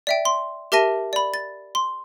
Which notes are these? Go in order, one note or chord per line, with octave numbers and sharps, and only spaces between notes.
D5 E5 G5
C6
G4 A#4 E5 A5 A#6 D#7
D5 B5
A6
C6